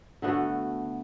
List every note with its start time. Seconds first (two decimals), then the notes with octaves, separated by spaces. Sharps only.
0.22 D3 A3 B3 F#4